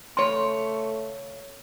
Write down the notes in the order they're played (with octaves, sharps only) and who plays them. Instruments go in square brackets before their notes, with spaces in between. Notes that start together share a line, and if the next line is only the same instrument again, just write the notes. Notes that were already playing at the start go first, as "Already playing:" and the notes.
[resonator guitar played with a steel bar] C#3 C#5 [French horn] A3 [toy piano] C6